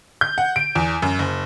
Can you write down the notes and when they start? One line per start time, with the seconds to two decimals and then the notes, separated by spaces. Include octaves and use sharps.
0.21 G6
0.38 F#5
0.56 D7
0.75 E2
1.02 F#2
1.19 F#1